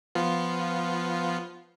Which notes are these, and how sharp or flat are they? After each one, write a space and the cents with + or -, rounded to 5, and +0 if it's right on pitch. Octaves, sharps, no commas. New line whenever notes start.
F3 -5 B3 +0 F4 +0